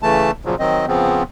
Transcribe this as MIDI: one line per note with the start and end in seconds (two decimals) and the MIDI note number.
0.02 0.31 49
0.02 0.31 52
0.02 0.31 57
0.02 0.31 81
0.45 0.55 46
0.45 0.55 49
0.45 0.55 53
0.45 0.55 54
0.59 0.86 51
0.59 0.86 54
0.59 0.86 60
0.59 0.86 75
0.87 1.23 49
0.87 1.23 53
0.87 1.23 59
0.87 1.23 60